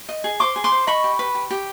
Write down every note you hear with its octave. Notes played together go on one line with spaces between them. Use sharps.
D#5
G#4
C5 C6 D6
G#4
C6 D6
C5
D#5 B5 C#6
G4
B4
G4
G4